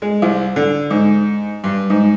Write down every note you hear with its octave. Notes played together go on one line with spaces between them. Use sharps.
G#3
C2
D3
G#2
G2
G#2